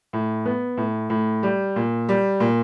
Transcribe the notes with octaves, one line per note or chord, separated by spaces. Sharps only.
A2
B3
A2
A2
G3
A#2
G3
A#2